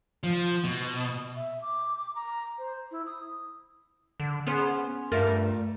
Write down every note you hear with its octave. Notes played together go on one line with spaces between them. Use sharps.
F3
B2
E5
D6
A#5
C5
E4
D#6
D3
B3 C#4 G#4 C5
G2 A3 F4 A#4